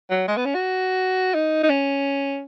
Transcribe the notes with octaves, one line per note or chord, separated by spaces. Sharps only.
F#3
G#3
B3
C#4
F#4
D#4
D#4
C#4